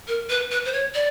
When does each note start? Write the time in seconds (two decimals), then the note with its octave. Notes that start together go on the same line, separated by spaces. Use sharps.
0.08 A#4
0.29 B4
0.51 B4
0.65 C5
0.72 C#5
0.94 D5